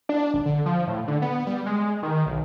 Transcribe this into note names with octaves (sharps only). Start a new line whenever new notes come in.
D4
G#1
D3
F3
A2
D3
B3
G3
G#3
D#3
B1